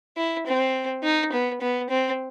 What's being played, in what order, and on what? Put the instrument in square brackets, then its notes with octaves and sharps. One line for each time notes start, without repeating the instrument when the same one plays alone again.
[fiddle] E4
C4
D#4
B3
B3
C4